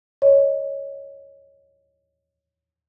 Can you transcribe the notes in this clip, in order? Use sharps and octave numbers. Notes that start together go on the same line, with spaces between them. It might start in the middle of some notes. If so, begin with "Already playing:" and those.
C#5 D#5